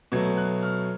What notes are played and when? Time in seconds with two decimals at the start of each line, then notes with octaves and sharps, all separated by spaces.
0.12 B2 F#3 A3 G#6
0.37 F#6
0.63 F6